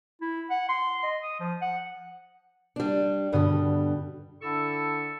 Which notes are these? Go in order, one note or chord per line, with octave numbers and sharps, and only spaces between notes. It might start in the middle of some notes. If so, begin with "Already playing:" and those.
E4
F#5
C6
D#5
D#6
F3
F#5
G3 D4
G2 B2 D3 G3 D#6
D3 D4 E4 A4 C#6 E6